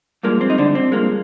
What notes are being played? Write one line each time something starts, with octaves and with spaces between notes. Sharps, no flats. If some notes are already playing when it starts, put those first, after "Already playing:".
G2 F3 G#3 A#3
C4
D#4
D3 D4
C4
G2 F3 G#3 A#3